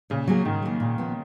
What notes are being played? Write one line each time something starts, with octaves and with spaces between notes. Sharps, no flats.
A#2 C#3
F#3 A#3 C#4 G#4
G#2 D#3
F#3 A#3
A#2
F3 B3